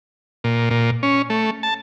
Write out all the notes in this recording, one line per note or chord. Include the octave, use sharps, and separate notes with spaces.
A#2
A#2
C#4
A3
A5